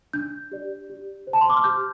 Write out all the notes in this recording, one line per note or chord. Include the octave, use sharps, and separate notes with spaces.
D4 G6
G4 D5
G4
C5
A5
C6
D6
F6
G4 G6